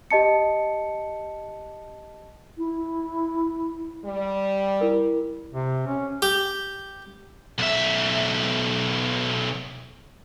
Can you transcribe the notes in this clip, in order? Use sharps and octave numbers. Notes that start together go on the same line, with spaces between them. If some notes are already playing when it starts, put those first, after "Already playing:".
G4 D#5 A5 C#7
E4
G3
E4 A#4
C3
C#4
G4
B1 E5